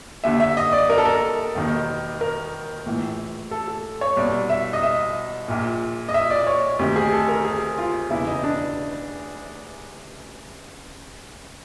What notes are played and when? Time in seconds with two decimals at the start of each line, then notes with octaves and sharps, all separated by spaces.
0.24 D#2 D3 E5
0.40 E5
0.57 D#5
0.73 D5
0.90 A#4
0.98 A4
1.06 A#4
1.55 E1 D#2 D#3
2.21 A#4
2.86 A#1 A2 E3
3.51 A4
3.68 A4
4.01 C#5
4.17 C2 B2 D5
4.50 E5
4.73 D#5
4.83 E5
5.48 A#1 A#2
6.09 D#5
6.14 E5
6.30 D5
6.47 C#5
6.79 D2 C3 D#3 G4
6.96 G#4
7.12 A4
7.29 A#4
7.45 G#4
7.78 F4
8.10 E1 E2 C#3 E4
8.27 D#4
8.44 D4